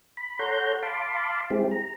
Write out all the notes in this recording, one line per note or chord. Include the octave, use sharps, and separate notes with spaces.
B5
A4 C#5 F#5 A#5 C6 G6
F5 A5 B5 C6 D6
G#3 C4 E4 G4 G#4
A#5